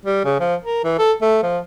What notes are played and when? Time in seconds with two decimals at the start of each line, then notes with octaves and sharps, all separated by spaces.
0.05 G3
0.24 C#3
0.40 F3
0.63 A#4
0.84 E3
0.99 A4
1.21 A3
1.43 F3